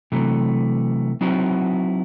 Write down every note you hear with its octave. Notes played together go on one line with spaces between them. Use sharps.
C3 E3 F#3 A3
F#3 C4 D#4 E4 F#4